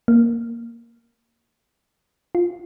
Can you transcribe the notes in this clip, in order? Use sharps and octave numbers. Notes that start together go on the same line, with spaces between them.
A#3
F4